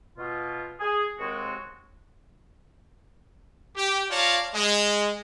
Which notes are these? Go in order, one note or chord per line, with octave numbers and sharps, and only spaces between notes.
B2 F4
G#4
D#2 G#3 C4 F#4
G4
F4 C#5 D5 F5 A5 A#5
G#3